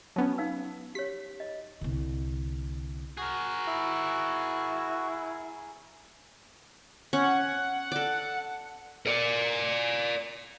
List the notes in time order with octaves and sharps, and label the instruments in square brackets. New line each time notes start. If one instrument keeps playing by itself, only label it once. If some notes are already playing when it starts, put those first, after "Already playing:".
[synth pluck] F#3 B3 C#4 [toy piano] A5
[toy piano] D#4 F5 E6
[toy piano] G4 C#5 [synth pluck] B6
[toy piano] D#5
[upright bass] C2 D3
[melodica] F#4 [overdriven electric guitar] G#4 A#4
[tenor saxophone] E4
[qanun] C#4 [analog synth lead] F#5
[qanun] A4 D5
[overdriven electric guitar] A#4 D5